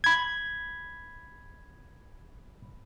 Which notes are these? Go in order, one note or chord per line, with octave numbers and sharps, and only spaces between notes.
B5 G#6